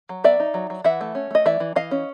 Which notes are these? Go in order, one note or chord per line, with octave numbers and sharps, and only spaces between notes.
F#3
B3 D5 E5
D#4
F#3
F#3
E3 E5 F#5
A3
C#4
A3 D#5
E3 D5 E5
E3
E3 D#5 F5
C#4